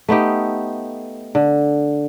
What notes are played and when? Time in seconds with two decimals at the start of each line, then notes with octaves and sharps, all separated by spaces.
0.09 A3 B3 D#4 G4
1.35 D3